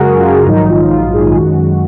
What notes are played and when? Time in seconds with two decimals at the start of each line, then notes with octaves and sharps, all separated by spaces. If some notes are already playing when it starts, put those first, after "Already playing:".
Already playing: F#2 C#3 G#3 F#4 G#4 A#4
0.18 F4
0.47 A#1 G#2 D#3 F#3 D#4
0.69 F4
0.81 D#4
0.91 F4
1.13 G#4
1.25 G#4
1.36 F#2 D#3 G#3 F#4